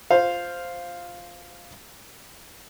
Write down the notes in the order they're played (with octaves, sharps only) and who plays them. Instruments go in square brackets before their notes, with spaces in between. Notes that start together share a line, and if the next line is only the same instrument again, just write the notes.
[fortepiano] F4 C5 F5